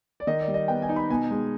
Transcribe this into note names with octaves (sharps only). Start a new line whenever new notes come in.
D5
D#3 D#5
D5
G3
D#5
B3 G5
G#5
D#4
B5
B2 G#5
G#3